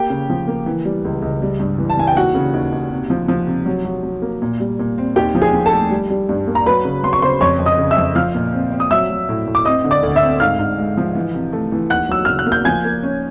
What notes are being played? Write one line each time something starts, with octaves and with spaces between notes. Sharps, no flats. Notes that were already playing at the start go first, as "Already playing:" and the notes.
Already playing: A#3 G4 G5
C#3
F3
A#3
E3
G3
C#2
C#2
G3
G2
E3
A5
E3 G#5
G5
D#2 F#4 F#5
C#3
D#2
D#2
C3
F3
F3
C3
F#3
F#3
F#3
A#3
A#2
G3
A#2
C4
D#2 G4 G5
F3
G#4 G#5
F3
A4 A5
A3
G3
G3
G2
A#3
A#5
F#3 B4 B5
C#3
F#3 C6
C#6
C#3 C5 C6
F2 C#5 C#6
F2
D#5 D#6
C#3
E5 E6
F2
F3 F5 F6
A#2
C4
C4
D#6
F#3 E5 E6
F#3
A2
A2
D6
C4 D#5 D#6
D3
D5 D6
D2
E5 E6
C4
G#2 F5 F6
G#2
G#3
F3
E3
C3
A3
E3
D#2 F#5 F#6
F#3 E6
C#3 F6
F#6
A#3
G6
F3 G#5 G#6
A#3
C#4